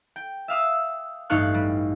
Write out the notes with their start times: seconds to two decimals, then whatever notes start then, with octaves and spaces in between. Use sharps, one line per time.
0.16 G5
0.48 E5 F5 D#6 E6
1.30 A1 G2 D#4 F5 C#6 F#6
1.54 G3